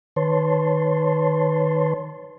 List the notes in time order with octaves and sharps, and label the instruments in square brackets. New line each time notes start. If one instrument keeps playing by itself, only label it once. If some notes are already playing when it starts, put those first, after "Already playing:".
[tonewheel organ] D#3 B4 C#5 A5 C6